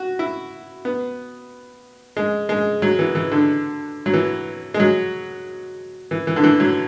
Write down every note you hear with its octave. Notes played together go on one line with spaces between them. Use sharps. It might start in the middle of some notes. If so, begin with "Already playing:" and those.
Already playing: F#4
E4
B3
G#3
G#3
F#3
E3
E3
D3
F#3
E3
G#3
F#3
E3
E3
D3
E3
F#3